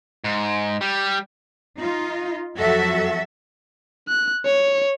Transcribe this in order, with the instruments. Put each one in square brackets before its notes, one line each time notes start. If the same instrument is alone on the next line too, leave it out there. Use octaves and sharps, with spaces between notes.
[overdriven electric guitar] G#2
G3
[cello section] D#4 F4
F2 F#3 F#4 A4 E5
[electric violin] F#6
C#5